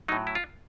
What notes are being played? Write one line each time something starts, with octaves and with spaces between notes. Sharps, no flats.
A2 F#3 D#4
E4
F4